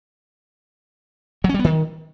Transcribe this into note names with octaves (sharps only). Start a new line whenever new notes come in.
F#3
C#4
G3
B3
D#3